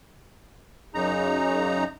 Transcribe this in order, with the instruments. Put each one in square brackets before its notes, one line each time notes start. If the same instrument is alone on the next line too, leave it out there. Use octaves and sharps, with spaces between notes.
[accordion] F#2 C#3 D#4 A#5